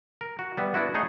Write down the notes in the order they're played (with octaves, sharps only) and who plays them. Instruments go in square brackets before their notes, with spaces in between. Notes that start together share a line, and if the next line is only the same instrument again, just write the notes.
[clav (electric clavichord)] A#4
F#4
G3 B3 E5
B3 D4 E4 F#4
A3 D#4 G#4 C#5 D#5